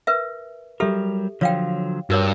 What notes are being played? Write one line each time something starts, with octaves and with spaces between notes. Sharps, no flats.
A#4 B4 E5
F#3 G3 G4 A4 A#4 E5
D3 F3 F#3 C#5 F5 G5
G2 F#4 A#4 C#5